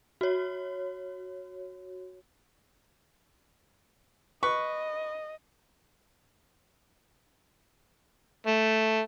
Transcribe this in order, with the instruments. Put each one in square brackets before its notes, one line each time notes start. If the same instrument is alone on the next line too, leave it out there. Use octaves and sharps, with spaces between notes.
[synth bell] F#4 C#5
[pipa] B4 [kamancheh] D#5 [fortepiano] C#6
[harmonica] A3